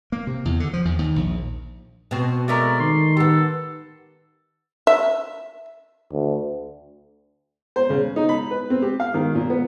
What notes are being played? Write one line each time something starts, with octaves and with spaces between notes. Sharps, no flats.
A#3
C3
E2
D3
F3
E2
D#2
A#1
B2 C4
G#3 A3 A#4 D5
D#3 C6
B3 G4 A4
E5
D2
C5
C#3
D#4
B5
B4
C4
G4
F5
D#3
A#2
B3